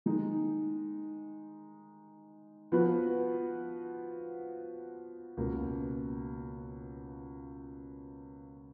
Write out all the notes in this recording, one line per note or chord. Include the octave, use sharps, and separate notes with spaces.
D#3 G#3 D#4 G#4
F3 B3 F#4 B4
C#2 B2 A#3